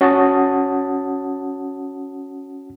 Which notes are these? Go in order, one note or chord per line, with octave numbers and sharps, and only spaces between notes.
C#4 F#4 F#5 A5 D#6